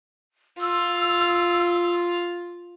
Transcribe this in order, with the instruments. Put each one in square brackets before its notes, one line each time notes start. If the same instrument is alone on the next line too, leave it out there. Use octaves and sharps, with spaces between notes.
[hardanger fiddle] F4 [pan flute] E6